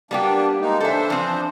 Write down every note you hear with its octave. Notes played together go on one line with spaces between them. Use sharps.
G3 A#3 B3 D4 G4
G#3 A#3 D#4
E3 D4 A4 C5 E5
F3 C4